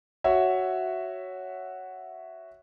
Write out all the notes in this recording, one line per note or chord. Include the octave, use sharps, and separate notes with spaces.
F#4 C#5 E5